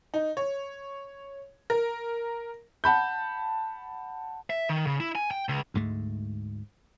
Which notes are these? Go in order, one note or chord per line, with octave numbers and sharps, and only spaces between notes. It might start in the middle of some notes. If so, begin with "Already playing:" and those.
D#4
C#5
A#4
F#5 A5 B5 G6
E5
D#3
C#3
E4
G#5
G5
C#2
D2 G#2 G#3 A3